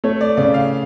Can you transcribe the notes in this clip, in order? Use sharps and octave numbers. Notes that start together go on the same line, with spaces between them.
A3 C#5
D5
C#3 D5
F5